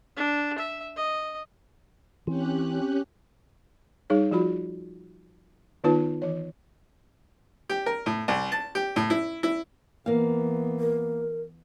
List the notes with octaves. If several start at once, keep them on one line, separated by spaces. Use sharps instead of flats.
D4
E5
D#5
E3 C4 C#4 G4 F#6
G3 D#4 G#4 C#5
F3 F4 F#4 B5
D#3 B3 D#4 F4 B4 A5
E3 C#5
G4
A#4
A2
C2
A5
G4
A2
E4
E4
E3 A#3 B3 F5
A#4